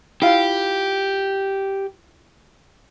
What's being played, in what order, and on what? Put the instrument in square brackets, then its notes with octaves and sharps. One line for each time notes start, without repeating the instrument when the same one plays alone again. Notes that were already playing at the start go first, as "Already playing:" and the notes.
[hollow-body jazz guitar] E4 F4 F5 [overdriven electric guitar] G4